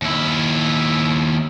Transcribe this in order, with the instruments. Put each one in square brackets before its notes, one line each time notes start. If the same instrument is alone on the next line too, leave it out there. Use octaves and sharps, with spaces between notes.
[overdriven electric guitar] D#2 E4